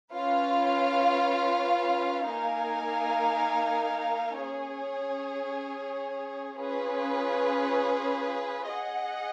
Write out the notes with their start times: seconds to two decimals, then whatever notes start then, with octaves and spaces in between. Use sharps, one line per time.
0.14 C#4 F4 B4 F5
2.28 A#3 D#4 A#4 F5 G#5
4.43 C#4 G#4 C#5
6.57 C#4 F4 G#4 B4
8.70 G#4 D#5 F#5